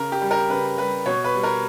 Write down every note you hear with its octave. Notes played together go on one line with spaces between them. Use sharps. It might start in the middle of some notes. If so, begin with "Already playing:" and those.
Already playing: C#3 A#4
G4
G3
A#4
C#3 B4
G3 B4
B2 C#5
B4
G3
A#4